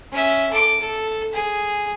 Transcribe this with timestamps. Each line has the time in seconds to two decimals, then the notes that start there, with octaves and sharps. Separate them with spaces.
0.12 C#4 E5
0.51 A4 D6
0.80 A4
1.33 G#4